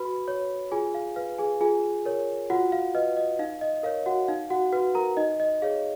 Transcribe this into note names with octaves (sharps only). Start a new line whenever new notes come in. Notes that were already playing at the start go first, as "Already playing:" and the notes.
Already playing: F#4 B4 B5
C#5
F4 G#4 G#5
F5
B4 F5
G#4 G#5
F4 G#4 G#5
A#4 C#5
F4 F#4 F#5
F5
B4 D#5
D#5
D#4 F5
D#5
A#4 C#5 F5
F#4 F#5
D#4 F5
F#4 F#5
F#4 B4
A#4 A#5
D#4 D#5
D#5
G#4 C#5 F5